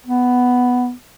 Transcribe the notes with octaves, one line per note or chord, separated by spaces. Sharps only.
B3